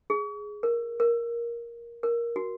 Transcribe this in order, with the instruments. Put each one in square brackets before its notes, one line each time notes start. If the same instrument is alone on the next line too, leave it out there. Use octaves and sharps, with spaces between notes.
[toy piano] G#4
A#4
A#4
A#4
F#4